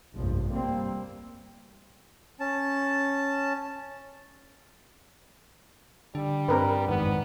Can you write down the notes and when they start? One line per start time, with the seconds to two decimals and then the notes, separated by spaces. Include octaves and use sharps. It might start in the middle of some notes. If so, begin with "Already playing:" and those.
0.15 F1 A#1 G2 F3
0.48 G3 A#3 C4
2.40 C#4 A5
6.15 D3 G3 D4
6.48 G2 C4 A#4 B4
6.88 G#1 F2 G#2 B3